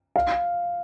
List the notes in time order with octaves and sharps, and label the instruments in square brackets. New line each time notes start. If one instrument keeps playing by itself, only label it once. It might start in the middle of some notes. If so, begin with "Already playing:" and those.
[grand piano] F5